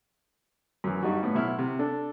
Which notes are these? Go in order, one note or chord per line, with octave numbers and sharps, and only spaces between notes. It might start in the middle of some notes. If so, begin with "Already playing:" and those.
F#2 E3
G2 G3 D#4 F#4
A2 B3
B1 E4 F6
C3
D4 A4